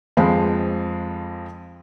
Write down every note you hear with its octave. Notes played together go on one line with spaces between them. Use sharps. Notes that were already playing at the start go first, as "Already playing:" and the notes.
F2 F3 G#3 C5 F5 B5